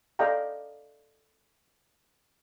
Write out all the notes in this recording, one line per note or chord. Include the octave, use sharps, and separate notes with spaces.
A4 D5 D#5 F5 G5 A#5